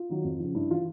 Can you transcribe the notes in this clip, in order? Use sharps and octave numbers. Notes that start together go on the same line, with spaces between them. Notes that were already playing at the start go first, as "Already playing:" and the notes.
Already playing: F4
D#3 F#3
F2
C#3 F3
G2 E4
E3 F4